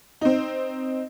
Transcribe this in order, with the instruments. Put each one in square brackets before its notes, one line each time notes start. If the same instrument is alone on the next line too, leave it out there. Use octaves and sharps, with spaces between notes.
[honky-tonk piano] C4 D#4